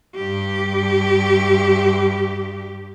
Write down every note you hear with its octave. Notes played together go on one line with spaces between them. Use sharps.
G2 G4